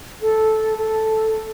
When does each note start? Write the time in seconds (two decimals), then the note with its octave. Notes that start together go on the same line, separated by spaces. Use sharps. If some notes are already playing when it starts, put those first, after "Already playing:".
0.22 A4
0.78 A4